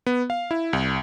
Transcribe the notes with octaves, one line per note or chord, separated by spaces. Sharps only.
B3
F5
E4
C2